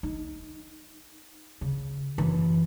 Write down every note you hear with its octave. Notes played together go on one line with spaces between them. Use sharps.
D#4
C#3
F#2 E3